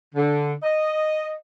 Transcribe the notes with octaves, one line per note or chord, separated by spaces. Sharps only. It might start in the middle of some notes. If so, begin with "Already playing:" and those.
D3
D#5